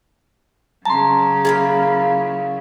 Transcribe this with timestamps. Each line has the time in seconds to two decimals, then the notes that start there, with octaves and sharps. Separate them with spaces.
0.85 C#3 F#3 A5 A#5 C6
1.45 A#3 E4 F4 G#4